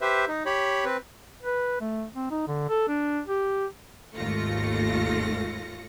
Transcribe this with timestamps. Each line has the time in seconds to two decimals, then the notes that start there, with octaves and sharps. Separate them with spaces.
0.01 G4 B4 C5 E5
0.28 D#4
0.46 G4 C#5 B5
0.85 C4 B4
1.43 B4
1.81 A3
2.14 C4
2.31 D#4
2.47 D3
2.69 A4
2.88 D4
3.27 G4
4.15 G#1 D#2 A3 F4 A#6 C#7